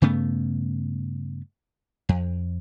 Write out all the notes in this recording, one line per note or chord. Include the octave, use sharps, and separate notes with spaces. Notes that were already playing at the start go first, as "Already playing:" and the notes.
G2 C#3 A3 B3
F2